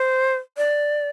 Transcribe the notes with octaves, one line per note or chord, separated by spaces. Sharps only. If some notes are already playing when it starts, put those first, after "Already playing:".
Already playing: C5
D5